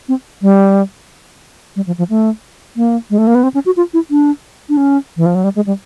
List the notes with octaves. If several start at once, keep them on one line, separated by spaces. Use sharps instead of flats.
C4
G3
G3
F3
F3
A3
A#3
G#3
A3
A#3
B3
C4
C#4
F#4
F4
E4
D4
D4
C#4
E3
F3
F#3
G3
G#3
G3